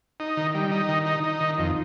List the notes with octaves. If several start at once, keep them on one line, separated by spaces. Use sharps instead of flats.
D#4
D#3
G3
D#4
D#3
D#4
D#4
D#3
F2